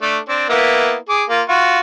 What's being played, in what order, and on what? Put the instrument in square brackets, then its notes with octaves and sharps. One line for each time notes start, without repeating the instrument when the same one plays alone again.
[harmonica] A3 D4
C4 D4
A#3 B3 E4
G#4 D6
A#3 F4
F4 F#4